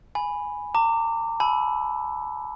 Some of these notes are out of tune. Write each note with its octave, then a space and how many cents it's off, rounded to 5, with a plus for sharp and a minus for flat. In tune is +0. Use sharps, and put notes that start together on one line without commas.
G#5 +0 B5 +0
A#5 -35 D6 +0
G#5 +45 B5 +0 E6 +0